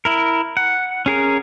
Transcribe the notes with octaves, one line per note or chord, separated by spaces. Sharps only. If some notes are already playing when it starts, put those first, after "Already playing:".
E4 A#4
F#5
C#4 G#4 A#4